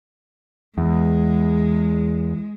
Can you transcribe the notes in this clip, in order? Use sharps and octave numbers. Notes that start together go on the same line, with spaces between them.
E2 G#3